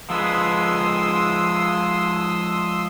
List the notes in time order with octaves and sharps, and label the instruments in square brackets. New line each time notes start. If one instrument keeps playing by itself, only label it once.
[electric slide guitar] F3 G#3 B4 [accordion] C6 D#6 E6